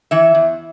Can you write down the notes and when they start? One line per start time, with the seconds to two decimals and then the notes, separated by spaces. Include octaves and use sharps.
0.11 E3 E5
0.35 E2